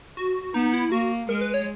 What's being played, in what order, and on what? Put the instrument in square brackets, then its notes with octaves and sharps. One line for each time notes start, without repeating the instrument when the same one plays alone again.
[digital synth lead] F#4
[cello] B3 [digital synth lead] D#4
[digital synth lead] E4
[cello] A#3 [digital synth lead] F#4
[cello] G#3 [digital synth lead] A#4
[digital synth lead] B4
C#5